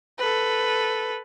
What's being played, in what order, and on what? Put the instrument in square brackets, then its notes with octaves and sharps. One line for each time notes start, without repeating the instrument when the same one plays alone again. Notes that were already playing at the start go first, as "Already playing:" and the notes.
[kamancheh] A4 B4